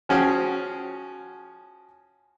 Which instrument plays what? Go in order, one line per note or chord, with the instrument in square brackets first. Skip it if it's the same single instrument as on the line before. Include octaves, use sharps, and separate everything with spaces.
[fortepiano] F3 C#4 F#4 G#4 G5